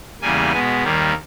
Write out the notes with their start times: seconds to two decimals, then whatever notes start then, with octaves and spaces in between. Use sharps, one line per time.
0.21 E2 C#3 G3 A#3 G#5
0.53 B2 G#3 B3
0.84 D#2 D#3 G3 A#3